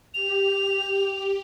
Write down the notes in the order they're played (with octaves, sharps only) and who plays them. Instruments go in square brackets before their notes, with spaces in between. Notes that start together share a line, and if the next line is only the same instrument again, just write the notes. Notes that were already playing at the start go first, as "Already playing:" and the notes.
[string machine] G4 [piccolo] F7